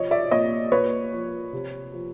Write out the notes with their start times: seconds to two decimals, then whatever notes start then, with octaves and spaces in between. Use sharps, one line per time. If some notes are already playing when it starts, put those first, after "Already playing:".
Already playing: C3 F3 C#5 D#5
0.11 D5 E5
0.31 A#2 C#5 D#5
0.72 A#2 B4 C#5
1.12 F3
1.53 C3
1.93 F3